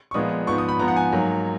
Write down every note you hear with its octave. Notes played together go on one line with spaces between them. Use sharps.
C#6
A#2 F3 G#3 B3 D#6
G#2 F3 B3 C#6
D#6
B5
G#2 F3 B3 A#5
F#5
G#5
G#2 F#3 A#3